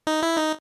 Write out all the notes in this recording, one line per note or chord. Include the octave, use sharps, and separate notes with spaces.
D#4
E4
D#4